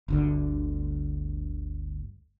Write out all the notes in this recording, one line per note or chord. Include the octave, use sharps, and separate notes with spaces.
G1 D2 D3